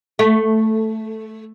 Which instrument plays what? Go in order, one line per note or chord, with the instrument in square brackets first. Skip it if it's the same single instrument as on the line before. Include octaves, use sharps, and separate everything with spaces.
[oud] A3